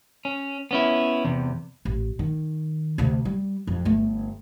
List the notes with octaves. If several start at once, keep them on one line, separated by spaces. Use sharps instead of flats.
C#4
B3 C#4 E4
E2 C3
A1
D#3
D2 C3
G3
F2
G1 A3